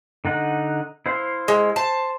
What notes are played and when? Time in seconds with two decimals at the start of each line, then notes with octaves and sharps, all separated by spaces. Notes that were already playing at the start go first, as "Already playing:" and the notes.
0.25 D3 D#4 F#5
1.06 E4 C5 F5
1.48 G#3
1.76 C5 A5